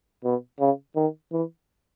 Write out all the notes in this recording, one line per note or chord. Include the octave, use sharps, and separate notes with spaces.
B2
C#3
D#3
E3